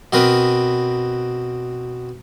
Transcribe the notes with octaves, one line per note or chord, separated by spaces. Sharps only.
B2 C4 A#4 B4 D#6